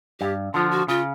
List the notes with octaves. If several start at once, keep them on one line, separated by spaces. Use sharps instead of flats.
G2 G4
D3 F3 F4
F#4
C#3 F4